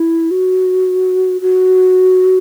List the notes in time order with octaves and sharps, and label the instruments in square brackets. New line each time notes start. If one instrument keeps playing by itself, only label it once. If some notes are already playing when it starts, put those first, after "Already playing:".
Already playing: [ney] E4
F#4
F#4